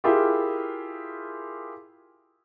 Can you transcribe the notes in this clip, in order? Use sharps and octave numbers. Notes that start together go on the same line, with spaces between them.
E4 F4 G4 G#4 A#4 E5